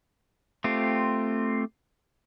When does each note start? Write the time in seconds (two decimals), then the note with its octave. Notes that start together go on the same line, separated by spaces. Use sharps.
0.64 A3 C4 F4 G4